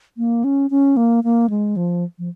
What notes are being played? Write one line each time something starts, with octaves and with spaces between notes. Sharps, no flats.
A#3
C#4
C#4
A#3
A#3
G#3
F3
F3